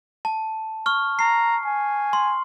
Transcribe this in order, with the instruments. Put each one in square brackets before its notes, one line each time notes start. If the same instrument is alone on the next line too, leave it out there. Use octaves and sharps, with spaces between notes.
[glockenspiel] A5
C#6 F6
[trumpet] A#5 [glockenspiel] C7
[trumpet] G#5
[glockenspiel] C6